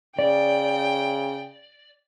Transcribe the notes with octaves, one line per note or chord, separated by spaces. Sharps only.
C#3 D5 G5